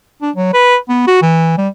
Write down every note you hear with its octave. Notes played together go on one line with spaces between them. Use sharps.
D4
F#3
B4
B3
F#4
E3
G3